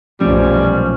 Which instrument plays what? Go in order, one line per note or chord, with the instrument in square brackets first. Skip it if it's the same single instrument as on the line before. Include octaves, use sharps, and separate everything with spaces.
[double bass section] B1 F#2 A#2 [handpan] F3 A3 C#4 [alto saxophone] G3